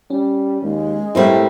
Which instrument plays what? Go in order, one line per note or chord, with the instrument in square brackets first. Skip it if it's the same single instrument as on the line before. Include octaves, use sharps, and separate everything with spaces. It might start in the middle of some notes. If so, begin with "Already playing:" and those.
[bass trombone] G3 [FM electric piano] C#4
[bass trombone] D#2 [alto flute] G#3
[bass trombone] A2 [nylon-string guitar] G3 A#3 C4 [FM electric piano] E4 C5 G5